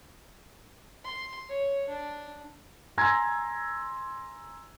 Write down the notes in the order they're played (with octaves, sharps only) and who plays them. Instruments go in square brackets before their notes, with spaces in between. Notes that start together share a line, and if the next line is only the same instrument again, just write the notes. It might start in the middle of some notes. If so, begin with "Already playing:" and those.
[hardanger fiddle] C6
C#5
D4
[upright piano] G#5 A#5 C6 E6 G#6 A#6